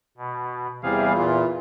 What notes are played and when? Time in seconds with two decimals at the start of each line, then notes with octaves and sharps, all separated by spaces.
0.17 B2
0.83 E2 C3 E3 G3 G#4 F5
1.15 A#2 F4